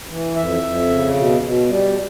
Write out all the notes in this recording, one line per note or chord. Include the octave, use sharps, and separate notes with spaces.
E3
F2 E5
F2
C#3
B2
B2
G3